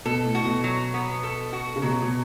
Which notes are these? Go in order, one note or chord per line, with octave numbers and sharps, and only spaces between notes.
B2 A4
A2
F#4
B2
F#3
B3
A4
F#4
C#3
B2 F#3
B2